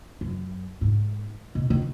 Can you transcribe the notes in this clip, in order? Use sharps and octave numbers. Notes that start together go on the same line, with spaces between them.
F#2
G#2
B2
D#3